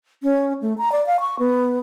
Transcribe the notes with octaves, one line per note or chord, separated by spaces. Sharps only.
C#4
A3
A#5
D5
F5
C#6
B3